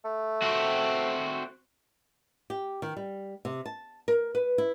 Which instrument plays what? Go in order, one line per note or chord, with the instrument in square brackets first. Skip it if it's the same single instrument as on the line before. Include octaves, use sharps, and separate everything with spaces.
[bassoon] A3
[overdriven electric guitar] C4 F#4
[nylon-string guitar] G4
D#3
G3
C3
A5
A#4
B4
E4